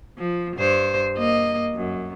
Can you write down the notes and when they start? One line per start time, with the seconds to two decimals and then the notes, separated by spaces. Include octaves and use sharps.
0.18 F3
0.57 G2 C5
1.16 A#3 D#5
1.74 F#2